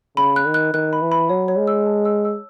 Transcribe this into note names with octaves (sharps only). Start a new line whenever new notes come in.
C#3 B5
F#6
D#3
F#6
D#3 F#6
B5
E3
B5
F#3 C#5
C#5
G#3
E6
A5
E6
E6